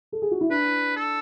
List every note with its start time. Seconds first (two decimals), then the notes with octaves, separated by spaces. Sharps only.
0.12 A4
0.22 G#4
0.31 F#4
0.41 E4
0.50 D4 B4
0.96 A4